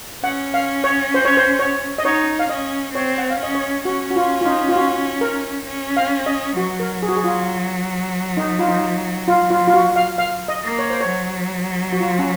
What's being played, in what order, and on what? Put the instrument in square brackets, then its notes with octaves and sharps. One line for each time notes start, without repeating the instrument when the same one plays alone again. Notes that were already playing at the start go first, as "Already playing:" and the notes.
[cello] C#4 [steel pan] F#5
[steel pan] F5
C#5
C5
C#5
C5
C#5
D#5
[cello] D#4 [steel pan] C#5
[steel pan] F5
[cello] C#4 [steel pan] D#5
[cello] C4 [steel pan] C#5
[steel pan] F#5
F5
[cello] C#4 [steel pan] D#5
[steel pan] C#5
[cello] C#4 [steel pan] F#4
[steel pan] F#4
F4
F4
D#4
F4
F#4
A#4
[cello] C#4
[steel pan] F5
D#5
[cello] F#3 [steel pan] F#4
[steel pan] A#4
G#4
F#4
G#4
F4
D#4
F4
D#4
F4
F4
F4
F#4
F5
F5
D#5
[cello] A#3
[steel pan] C#5
C5
C#5
[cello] F#3
[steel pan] F#4
F4
C#4